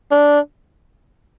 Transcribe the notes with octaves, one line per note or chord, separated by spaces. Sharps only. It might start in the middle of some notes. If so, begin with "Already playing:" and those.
D4